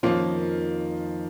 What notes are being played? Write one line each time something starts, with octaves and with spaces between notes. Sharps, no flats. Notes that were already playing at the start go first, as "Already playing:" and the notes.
F2 D#3 F3 A#3 C#4 F4